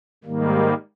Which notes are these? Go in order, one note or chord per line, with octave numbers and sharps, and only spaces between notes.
G#2 D#3 G3 A#3